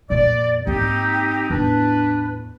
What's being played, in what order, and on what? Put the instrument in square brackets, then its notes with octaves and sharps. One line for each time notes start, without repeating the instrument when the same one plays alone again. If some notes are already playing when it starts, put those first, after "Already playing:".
[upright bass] F2 A#2 [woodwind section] D5
[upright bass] G#2 A#3 [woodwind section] C4 D#4 G4
[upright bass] E2 A2 [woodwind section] D4 B4